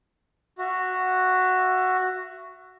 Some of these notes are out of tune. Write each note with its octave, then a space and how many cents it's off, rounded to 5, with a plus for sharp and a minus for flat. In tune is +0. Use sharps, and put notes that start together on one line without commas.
F#4 +0 E5 +30